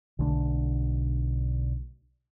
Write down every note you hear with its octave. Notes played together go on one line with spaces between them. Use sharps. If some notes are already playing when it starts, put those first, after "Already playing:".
B1 D3 A3 D4